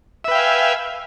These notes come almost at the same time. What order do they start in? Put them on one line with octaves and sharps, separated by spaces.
E5 B4 G5 F5 G#5